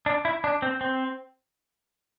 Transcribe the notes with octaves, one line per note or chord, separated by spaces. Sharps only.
D4
E4
D4
C4
C4